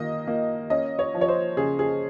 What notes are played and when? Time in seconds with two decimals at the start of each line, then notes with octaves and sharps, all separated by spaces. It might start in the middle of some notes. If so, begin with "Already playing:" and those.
Already playing: D#3 A#3 D#5
0.27 A#3
0.70 C#4 D#5
0.99 C#5
1.14 F3
1.21 C#5
1.28 C5
1.57 C#3 G#4
1.79 G#4